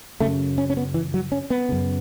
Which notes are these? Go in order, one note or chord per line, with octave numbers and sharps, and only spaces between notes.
F#2 C#3 A3
C#4
C#4
B3
E3
F#3
C#4
B3
F#2 C#3